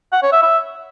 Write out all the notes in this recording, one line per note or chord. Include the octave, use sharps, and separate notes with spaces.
F#5
C#5
E5
E5